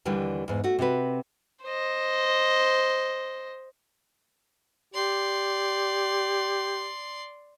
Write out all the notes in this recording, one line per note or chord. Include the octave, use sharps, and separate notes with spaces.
D#2 D3 E3 G3
E2 G#2
A3 F#4
C3 C4 F#4 B4
C5 D#5
G4 D5 C6